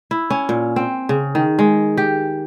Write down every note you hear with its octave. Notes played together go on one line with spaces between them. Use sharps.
E4
C#4
A#2
C4
C#3
D#3
G#3
G4